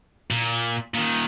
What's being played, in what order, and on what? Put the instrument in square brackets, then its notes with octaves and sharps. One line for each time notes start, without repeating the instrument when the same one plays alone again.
[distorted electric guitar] A#2
A#2 D#3